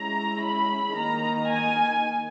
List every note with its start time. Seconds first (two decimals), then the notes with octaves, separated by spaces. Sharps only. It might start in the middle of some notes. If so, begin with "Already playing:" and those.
Already playing: G#3 C#4 E4 A#5
0.42 B5
0.96 D#3 A#3 D#4 A#5
1.51 G#5